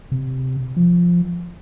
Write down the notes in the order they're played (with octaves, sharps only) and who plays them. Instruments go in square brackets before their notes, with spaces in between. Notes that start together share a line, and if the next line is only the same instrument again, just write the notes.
[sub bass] C3
F3